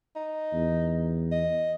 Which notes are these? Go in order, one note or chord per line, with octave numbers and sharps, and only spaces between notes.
D#4
E2
D#5